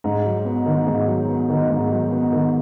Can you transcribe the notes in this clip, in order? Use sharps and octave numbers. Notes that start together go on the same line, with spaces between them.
G#2
F#3
B3
D#3
G#2
F#3
B3
D#3
G#2
F#3
B3
D#3